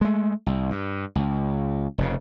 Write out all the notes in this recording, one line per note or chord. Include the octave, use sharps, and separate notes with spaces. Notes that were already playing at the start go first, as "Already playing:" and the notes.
G#3 A3
C2
G2
C#2
F1 F2 C#3